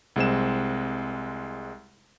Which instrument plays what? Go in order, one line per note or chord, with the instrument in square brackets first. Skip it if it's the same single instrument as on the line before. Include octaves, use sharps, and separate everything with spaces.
[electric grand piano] C2 G#3 C4 E7